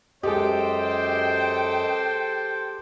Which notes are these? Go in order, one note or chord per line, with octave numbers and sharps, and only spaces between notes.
F#2 G#3 G4 A4 C5 D#5 G5